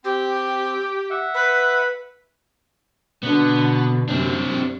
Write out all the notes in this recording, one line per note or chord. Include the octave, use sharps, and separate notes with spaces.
C4 G4
E5 F#5
B4
B2 D3 B3
F#2 C3 C4 D4